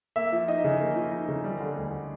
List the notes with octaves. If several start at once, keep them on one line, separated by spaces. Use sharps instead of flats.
A#3 E5
F3
D#4 D#5
C#3
A#3
F3
D#4
C#3
G3
D3
D2